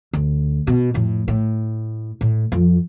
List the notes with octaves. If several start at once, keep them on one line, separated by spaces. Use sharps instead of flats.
D2
B2
F2 A2
A2
A2
F2 F3